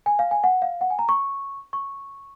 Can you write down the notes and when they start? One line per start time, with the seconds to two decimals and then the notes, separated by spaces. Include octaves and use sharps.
0.06 G#5
0.19 F5
0.31 G#5
0.44 F#5
0.62 F5
0.81 F#5
0.90 G#5
0.99 A#5
1.09 C#6
1.73 C#6